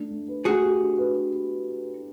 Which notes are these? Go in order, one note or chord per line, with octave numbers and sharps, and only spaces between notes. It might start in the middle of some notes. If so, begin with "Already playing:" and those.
Already playing: A3 D4
A3
B4
A3 F#4 G#4
G4
D4
B4